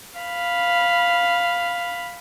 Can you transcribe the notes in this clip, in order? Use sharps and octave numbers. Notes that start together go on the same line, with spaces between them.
F5 B5